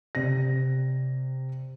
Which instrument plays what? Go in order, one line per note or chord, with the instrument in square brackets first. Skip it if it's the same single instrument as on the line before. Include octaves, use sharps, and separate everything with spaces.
[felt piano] C3 D5 A#6